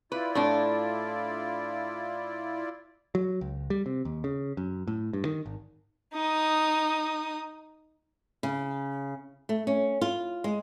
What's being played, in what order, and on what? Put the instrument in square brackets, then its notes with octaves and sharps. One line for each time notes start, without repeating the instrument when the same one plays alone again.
[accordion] E4 F4 D5 [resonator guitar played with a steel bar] B4
[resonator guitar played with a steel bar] A2 D4
[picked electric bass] F#3
C#2
G3
C3
D#2
C#3
F#2
A2
G2
D#3
G#1
[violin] D#4 D#6
[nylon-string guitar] C#3
A3
C#4
F4
G#3